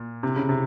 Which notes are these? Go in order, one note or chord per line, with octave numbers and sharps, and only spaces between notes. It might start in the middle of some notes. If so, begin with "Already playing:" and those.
Already playing: A#2
C3
C#3
C3